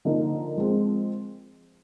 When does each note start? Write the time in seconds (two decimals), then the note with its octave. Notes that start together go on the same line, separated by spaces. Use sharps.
0.05 D3 F3 A#3 D#4 A#4
0.57 F3 G#3 C4